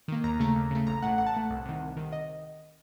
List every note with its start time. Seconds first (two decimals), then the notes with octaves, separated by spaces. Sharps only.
0.08 D#3 A#3
0.24 D#2 A#5
0.39 C#3 A3
0.55 D#2
0.71 C#3 A3
0.86 A1 A#5
1.02 A2 A3 F#5
1.18 A1 F#5
1.26 A5
1.34 A2 A3 F#5
1.50 C2
1.65 C3 D#3
1.81 C2
1.97 C3 D#3
2.13 D#5